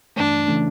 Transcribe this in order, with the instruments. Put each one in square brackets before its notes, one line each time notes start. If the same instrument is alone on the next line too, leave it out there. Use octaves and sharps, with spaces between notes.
[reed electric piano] G2 E3 A3 [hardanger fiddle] D4
[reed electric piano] C#3 E3 A3 C#4